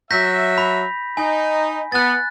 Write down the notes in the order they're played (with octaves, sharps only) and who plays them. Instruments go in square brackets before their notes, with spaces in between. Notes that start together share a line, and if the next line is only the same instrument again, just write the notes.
[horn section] F#3 E5 [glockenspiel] G6 A#6 B6
[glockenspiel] B5
[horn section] D#4 [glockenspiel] G#5
[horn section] B3 [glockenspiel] F#6 A6